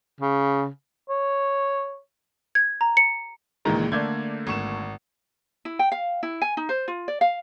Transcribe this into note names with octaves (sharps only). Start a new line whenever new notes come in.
C#3
C#5
G#6
A#5
C#7
C#2 A#2 D#3 E3 G#3 A#5
D3 A3 A#3 D5 G6 G#6
G#1 C#6 E7
E4
G5
F5
E4
G#5
D#4
C5
F4
D5
F5